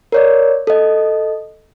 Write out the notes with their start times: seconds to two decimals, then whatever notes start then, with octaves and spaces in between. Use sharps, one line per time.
0.12 A#4 C#5 D5
0.67 A4 D#5